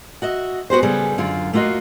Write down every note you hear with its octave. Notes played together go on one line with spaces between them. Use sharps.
F#4 D#5 E5
B3 F#4 G4 C5
C#3 G3 B3 G#4 A4
F#2 D3 F4
A3 A#3 F4 F#4 D#5